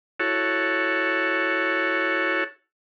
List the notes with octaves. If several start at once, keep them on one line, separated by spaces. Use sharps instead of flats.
E4 F#4 A4 C#5